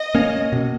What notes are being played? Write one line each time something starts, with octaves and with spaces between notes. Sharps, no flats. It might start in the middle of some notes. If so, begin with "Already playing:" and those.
Already playing: D#5
A#3 C#4
B2